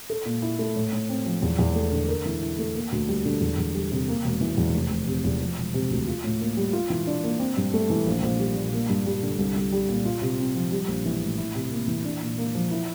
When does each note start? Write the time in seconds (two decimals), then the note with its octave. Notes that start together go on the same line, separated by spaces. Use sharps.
0.10 A4
0.25 A#2
0.42 E4
0.59 A3
0.76 A2
0.93 A2
1.09 C4
1.26 F3
1.42 E2
1.59 E2
1.76 A3
1.92 D3
2.08 A#4
2.26 E3
2.42 E4
2.59 A3
2.75 A#3
2.92 D2
3.08 G3
3.25 D3
3.41 E2
3.58 E2
3.75 G3
3.92 C3
4.08 A#3
4.24 E1
4.41 E3
4.58 E2
4.75 F1
4.90 F1
5.07 C3
5.24 E2
5.40 F3
5.57 E1
5.74 C3
5.90 D2
6.08 F4
6.24 A2
6.40 A#3
6.57 G3
6.73 F4
6.90 E3
7.07 D4
7.24 A#3
7.39 C4
7.57 G2
7.74 A3
7.90 E3
8.06 A#1
8.23 A#1
8.39 G3
8.56 A#2
8.73 A#3
8.89 G2
9.06 G3
9.23 D3
9.39 C2
9.56 C2
9.72 G3
9.89 A#2
10.05 F4
10.22 C3
10.39 C4
10.55 F3
10.72 G3
10.88 A#1
11.05 E3
11.22 A2
11.38 E4
11.55 C3
11.71 A#3
11.88 E3
12.05 D4
12.21 A#2
12.38 A#3
12.55 F3
12.71 E4